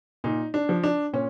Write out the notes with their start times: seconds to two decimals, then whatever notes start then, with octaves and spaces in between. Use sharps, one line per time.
0.24 A#2 D#4
0.54 D4
0.69 F3
0.84 D4
1.13 A#2 C#4